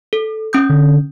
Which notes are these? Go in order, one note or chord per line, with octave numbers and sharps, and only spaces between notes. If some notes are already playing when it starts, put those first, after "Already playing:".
A4
C#4 D#6 G6
D3